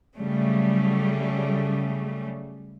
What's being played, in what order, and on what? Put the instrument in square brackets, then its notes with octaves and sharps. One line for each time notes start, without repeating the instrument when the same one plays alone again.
[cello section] C#3 F#3 G3 A3